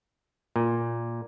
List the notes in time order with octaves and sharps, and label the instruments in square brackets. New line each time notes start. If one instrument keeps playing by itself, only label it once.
[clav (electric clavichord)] A#2